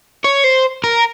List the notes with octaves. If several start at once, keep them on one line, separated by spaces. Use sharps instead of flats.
C#5
C5
A#4